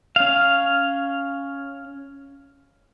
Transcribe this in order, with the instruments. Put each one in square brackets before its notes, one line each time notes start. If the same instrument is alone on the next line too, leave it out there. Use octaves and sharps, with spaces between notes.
[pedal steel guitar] C#4 F5